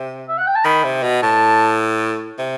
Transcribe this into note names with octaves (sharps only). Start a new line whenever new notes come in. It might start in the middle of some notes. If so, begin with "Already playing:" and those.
Already playing: C3
E5
F#5
G5
A5
D#3 B5
C3
B2
A2 A5
C3